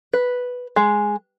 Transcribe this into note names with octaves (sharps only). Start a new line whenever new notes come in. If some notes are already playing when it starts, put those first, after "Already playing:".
B4
G#3